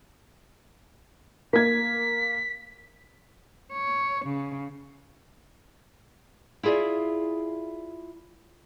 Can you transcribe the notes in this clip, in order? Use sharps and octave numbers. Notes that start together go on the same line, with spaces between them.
A#3 G#6 B6
C#5
C#3
E4 F4 G#4 D5 E5